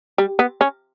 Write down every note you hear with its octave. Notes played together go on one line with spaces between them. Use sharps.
G3
B3
C#4